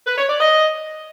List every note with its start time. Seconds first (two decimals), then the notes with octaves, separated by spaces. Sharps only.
0.07 B4
0.18 C#5
0.29 D5
0.40 D#5